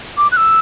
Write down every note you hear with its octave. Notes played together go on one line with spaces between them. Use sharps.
D6
F#6
E6